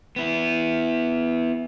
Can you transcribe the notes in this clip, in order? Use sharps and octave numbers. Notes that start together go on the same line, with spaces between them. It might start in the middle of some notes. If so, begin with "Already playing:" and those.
B3 E4